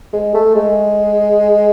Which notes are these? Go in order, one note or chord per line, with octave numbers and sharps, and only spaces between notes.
G#3
A3
G#3